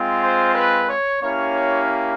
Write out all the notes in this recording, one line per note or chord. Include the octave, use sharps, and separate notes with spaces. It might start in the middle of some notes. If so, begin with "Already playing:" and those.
Already playing: G#3 C4 F4
C5
B4
C#5
A#3 C#4 E4 G4 C#5